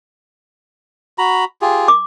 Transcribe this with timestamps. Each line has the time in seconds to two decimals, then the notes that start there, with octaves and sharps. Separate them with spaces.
1.18 F#4 A#5 B5
1.62 F4 G4 G#4
1.88 D6